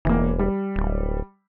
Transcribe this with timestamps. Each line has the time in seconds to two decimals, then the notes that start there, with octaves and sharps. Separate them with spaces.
0.05 E1 E3 A#3
0.39 G3
0.76 D1